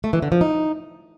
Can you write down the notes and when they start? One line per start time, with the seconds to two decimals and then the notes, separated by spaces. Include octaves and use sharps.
0.04 A3
0.13 E3
0.22 D3
0.32 F3
0.41 D#4